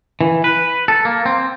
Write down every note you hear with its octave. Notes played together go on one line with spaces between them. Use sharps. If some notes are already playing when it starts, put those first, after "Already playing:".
E3
B4
A4
A#3
C4